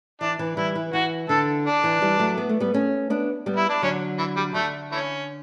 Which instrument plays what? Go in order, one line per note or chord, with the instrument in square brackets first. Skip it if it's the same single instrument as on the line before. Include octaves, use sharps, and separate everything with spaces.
[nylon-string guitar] E3 [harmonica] D4
[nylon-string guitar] E3
[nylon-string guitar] E3 G3 [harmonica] E4
[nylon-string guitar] E3
[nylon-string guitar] E3 [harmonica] F#4
[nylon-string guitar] D3 [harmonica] A4
[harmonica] D4
[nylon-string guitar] E3
E3 G3
F#3 A3
B3
A3
G3 B3
A3 C#4
B3 D4
G3 B3
[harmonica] E4
D4
[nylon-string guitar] D3 F#3 [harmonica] C#4
[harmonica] E3
G3
[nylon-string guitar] D3 [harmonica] A3
[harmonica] E3 A3 C#4